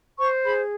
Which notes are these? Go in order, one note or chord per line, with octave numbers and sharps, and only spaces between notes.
C5 C#6
G#4 B5